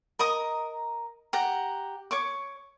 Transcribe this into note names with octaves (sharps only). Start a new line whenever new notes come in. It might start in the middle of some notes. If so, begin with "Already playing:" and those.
A#4 D#5 A#5 D#6
G4 F#5 A#5
C#5 C#6 D6